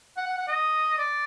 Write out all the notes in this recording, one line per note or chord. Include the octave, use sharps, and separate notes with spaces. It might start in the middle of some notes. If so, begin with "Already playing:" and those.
F#5
F#5
F#5
D#5
D5